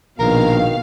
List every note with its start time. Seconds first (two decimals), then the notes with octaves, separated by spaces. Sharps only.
0.20 A#1 B2 D#3 A#4 F5